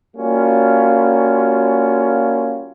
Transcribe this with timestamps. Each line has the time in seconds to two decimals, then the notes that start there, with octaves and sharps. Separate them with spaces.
0.16 G3 A#3 C#4 F4 F#4